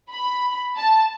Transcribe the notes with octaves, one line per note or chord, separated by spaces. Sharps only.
B5
A5